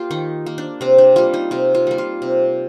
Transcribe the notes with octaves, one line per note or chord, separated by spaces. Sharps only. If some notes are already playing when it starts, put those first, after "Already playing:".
Already playing: A#3 F4 G4
D#3 D#4
A#3
D4
C3 C4
D4
G3 A#3 F4
D#4
C3 F4
F4
G3 A#3
F4
C3